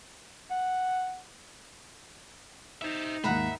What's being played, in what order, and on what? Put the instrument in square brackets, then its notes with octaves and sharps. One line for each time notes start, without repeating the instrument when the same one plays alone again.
[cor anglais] F#5
[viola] D#4 [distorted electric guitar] C5 E5
[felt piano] D#2 G#2 [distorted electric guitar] E5 [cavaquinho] F#5 A#5 B5